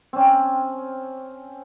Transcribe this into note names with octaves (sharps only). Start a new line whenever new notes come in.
C4 C#4